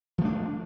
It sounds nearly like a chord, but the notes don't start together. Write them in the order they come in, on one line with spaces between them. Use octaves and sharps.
F3 A3 D4